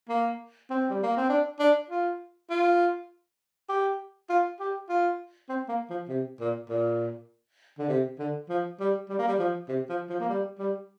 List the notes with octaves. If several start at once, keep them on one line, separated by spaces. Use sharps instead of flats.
A#3
C4
G3
A#3
C4
D4
D4
F4
F4
G4
F4
G4
F4
C4
A#3
F3
C3
A#2
A#2
D3
C3
D3
F3
G3
G3
A#3
G3
F3
C3
F3
F3
A#3
G3
G3